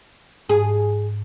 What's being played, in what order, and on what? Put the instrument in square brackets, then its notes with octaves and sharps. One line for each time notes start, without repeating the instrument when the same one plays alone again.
[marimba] G#2 [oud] G#4